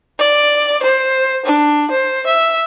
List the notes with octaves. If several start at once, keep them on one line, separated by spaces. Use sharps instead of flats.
D5
C5
D4
C5
E5